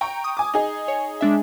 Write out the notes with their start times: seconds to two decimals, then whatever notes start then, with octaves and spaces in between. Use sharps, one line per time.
0.01 G5 A#5 C#6
0.24 D#6
0.37 G#5 D6
0.54 D#4 G#4
0.88 C#5
1.21 G#3 D4 E5